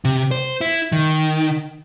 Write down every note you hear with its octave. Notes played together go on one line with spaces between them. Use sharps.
C3
C5
E4
D#3